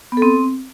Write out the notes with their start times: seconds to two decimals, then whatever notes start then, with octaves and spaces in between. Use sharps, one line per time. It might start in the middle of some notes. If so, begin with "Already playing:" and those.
0.12 B3
0.17 A4
0.22 C4